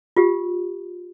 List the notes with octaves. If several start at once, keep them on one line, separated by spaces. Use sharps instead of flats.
F4 G4